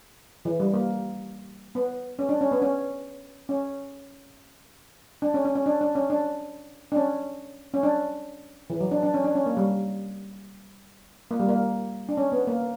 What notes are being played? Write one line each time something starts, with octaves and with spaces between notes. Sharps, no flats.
E3
G3
A#3
B3
C#4
D4
C#4
B3
C#4
C#4
D4
C#4
C#4
C#4
D4
D4
C#4
D4
D4
C#4
C#4
D4
E3
F#3
D4
D4
C#4
D4
C#4
A#3
G3
A#3
G3
A#3
D4
C#4
B3
A#3